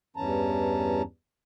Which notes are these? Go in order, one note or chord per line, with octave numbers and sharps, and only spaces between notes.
E2 G2 E3 C#4 A5 A#5